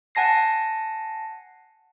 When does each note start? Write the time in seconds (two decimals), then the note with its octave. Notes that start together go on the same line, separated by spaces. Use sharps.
0.15 F#5 G#5 A5 A#6 C7